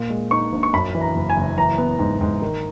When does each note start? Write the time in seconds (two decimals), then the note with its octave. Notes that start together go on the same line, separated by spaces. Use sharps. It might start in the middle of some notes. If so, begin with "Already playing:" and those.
Already playing: A#2
0.10 G#3
0.31 D#4 C#6
0.52 A#1
0.63 C#6
0.73 F#2 B5
0.95 E3
1.01 A#5
1.15 F#1
1.30 G#5
1.37 F#1
1.58 E3 A#5
1.78 B3
1.99 G#2
2.21 G#2
2.42 D#3